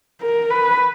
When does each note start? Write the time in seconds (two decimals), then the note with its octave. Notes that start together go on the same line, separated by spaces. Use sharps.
0.21 A#4
0.50 B4